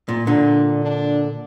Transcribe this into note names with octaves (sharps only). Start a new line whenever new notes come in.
A#2
A#2 D3 D4
D4